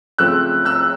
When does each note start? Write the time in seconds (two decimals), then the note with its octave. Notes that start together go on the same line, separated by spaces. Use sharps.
0.18 C#3 F3 A3 C4 E6 F#6
0.65 E6 F#6